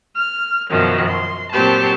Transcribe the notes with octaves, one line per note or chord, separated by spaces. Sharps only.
F6
F#2 B2 D#3 F3 F#3
C6
A#2 F#3 C4 G4 C5 A5